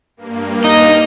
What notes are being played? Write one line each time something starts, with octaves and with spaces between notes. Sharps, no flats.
G2 A#3
D#4 D#5